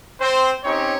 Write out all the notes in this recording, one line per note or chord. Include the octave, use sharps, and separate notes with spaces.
C4 C5
C4 C#4 D#4 G4 C#5